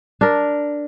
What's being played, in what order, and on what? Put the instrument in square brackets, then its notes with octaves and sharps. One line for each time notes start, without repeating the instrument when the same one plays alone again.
[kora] D4 A#4